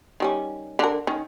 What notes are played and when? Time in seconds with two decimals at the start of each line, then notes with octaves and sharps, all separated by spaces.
0.20 D#3 G3 C#4
0.79 D3 A#4
1.07 D#3 C#4